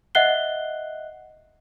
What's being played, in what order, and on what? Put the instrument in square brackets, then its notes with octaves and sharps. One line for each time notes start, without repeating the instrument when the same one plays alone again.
[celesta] D#5 E5 F#5 F#6 C7 G7